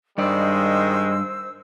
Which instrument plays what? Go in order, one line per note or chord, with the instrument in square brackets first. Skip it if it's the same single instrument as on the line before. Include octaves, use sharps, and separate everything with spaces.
[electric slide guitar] G2 D5 [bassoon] D#3 [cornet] G#3 [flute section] C5 E6